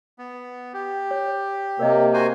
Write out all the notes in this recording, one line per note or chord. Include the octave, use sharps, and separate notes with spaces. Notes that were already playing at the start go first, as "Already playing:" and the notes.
B3
G4
C#5
C3 A#3 A#4 C#5 D#5
F#4 C5 G#5